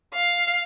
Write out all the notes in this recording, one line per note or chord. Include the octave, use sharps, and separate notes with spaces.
F5